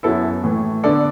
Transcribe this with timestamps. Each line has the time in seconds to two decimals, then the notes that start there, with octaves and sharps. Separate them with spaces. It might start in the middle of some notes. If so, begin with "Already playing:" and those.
0.03 F#2 F#3 B3 E4 A4
0.44 A2 E3 A3
0.83 D3 B3 A4 D5